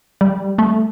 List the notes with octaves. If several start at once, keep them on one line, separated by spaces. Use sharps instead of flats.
G3
A3